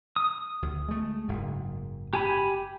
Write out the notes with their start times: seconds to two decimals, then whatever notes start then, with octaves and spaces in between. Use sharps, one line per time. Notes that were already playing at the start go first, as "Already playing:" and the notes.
0.16 D#6
0.62 D2
0.88 G#3 A3
1.28 F#1 G#2
2.13 G4 G#5 B5